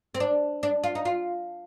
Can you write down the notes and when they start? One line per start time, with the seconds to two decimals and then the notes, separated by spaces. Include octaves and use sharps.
0.15 C4
0.20 D4
0.63 D4
0.84 F4
0.95 D#4
1.05 F4